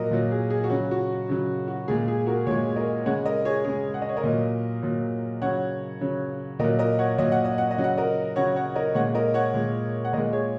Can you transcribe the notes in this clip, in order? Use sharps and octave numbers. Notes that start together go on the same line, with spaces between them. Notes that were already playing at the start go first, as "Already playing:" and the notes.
Already playing: A#2 F#3 A#4 D#5
A#2 F#3
G#4
G#4
F#4
C#3 F#3
F#4
C#3 F#3
F#4
A#2 G#3 G#4
G#4
F#4 A#4
A#2 G#3 G#4 C#5
A#4 D#5
C#3 G#3 C#5 F#5
A#4 D#5
G#4 C#5
C#3 G#3 G#4 C#5
F#5
D#5
C#5
A#4 D#5
A#2 F#3
A#2 F#3
C#3 F#3 C#5 F#5
C#3 F#3
A#2 F#3 A#4 D#5
A#4 D#5
C#5 F#5
A#2 F#3 D#5
F#5
D#5
F#5
D#5
C#3 F#3
F#5
A#4 D#5
C#3 F#3 C#5 F#5
C#5 F#5
A#4 D#5
A#2 G#3 C#5 F#5
A#4 D#5
C#5 F#5
A#2 G#3
F#5
A#2 G#3 A#4 D#5
G#4 C#5